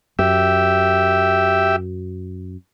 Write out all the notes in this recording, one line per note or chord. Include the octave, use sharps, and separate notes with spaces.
F#2 G4 E5